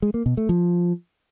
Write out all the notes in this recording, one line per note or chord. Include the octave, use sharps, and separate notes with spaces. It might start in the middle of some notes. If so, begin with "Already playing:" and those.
G#3
A#3
B2
A3
F3